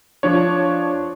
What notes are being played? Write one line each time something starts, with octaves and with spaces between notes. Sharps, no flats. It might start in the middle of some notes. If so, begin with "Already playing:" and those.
F3 D4 C#5